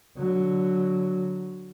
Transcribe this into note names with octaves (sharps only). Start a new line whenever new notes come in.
D3 F#3